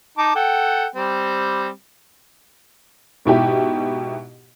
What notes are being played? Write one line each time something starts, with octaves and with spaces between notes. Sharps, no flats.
D#4 A5 D6
A4 F#5 G5
G3 C4
G#2 B2 E4 G4